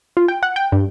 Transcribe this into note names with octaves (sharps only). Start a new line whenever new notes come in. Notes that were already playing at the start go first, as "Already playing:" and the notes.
F4
G5
F#5
G5
G2